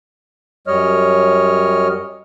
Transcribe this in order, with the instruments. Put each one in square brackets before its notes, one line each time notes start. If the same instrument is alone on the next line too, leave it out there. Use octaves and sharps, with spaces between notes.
[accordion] F#2 G3 C#5 D#5 F6